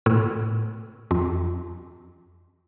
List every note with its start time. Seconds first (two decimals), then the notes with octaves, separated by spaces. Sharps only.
0.06 A2
1.11 F2